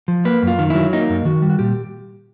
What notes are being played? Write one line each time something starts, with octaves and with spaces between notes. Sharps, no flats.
F3
A#3 B4
F#2 F4
D#3
F#3 E4
A#3 D#4
F#2
D#3 F#4
G3
F#4
A#2 G4